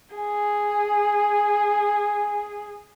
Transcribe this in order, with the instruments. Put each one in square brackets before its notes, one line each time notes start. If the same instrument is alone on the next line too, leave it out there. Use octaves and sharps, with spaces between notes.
[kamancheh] G#4 [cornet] G#5